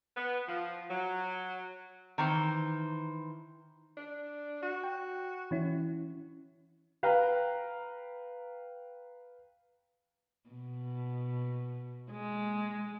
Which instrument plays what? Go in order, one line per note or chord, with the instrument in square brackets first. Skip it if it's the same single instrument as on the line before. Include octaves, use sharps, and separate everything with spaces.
[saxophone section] B3
F3
F#3
[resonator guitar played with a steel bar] D#3 E3 C5
[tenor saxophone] D4
F#4
[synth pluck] G5
E3 C#4 E4
[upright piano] B4 F5 G5 A#5
[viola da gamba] B2
G#3